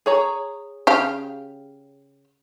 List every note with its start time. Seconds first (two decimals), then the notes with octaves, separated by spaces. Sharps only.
0.06 G#4 C#5 A#5
0.87 C#3 G4 F5